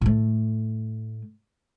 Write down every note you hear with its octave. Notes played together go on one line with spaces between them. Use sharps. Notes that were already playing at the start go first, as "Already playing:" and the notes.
A2 A3